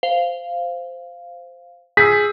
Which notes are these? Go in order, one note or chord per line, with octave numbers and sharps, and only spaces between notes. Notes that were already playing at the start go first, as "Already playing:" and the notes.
C5 F5
G#4 E6 G6 B6